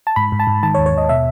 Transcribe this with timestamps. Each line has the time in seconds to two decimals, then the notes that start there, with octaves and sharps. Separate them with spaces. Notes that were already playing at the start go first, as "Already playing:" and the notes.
0.07 A5
0.16 G#2 B5
0.32 G#2
0.40 A5
0.47 G#2
0.63 D#3 A5
0.75 C#5
0.78 D#2
0.86 C#5
0.94 D#2 D#5
1.09 B2 E5